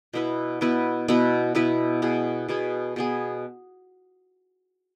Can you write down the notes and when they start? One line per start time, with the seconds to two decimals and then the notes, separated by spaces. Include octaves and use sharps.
0.13 B2 B3 E4 B4
0.61 B2 B3 E4 B4
1.08 B2 B3 E4 B4
1.55 B2 B3 E4 B4
2.02 B2 B3 G#4
2.49 B2 B3 G#4
2.96 B2 B3 G#4